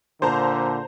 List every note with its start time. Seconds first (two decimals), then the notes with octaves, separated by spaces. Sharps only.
0.22 A#2 D3 C5 A5 A#5